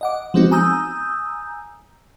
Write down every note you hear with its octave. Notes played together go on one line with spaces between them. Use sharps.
D#5 F#5 D6
F3 G#3 B3 C4 D#4 F#4
G#5 A#5 D#6 E6 G6